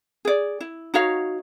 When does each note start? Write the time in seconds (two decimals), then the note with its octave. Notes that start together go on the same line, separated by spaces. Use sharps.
0.25 G#4 D5
0.61 E4
0.94 D#4 F#4 C#5 F5